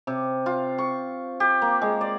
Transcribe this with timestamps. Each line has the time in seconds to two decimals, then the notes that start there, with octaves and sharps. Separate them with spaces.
0.07 C3
0.46 F4
0.78 C#6
1.40 G4
1.62 A#3
1.82 G#3
2.01 D5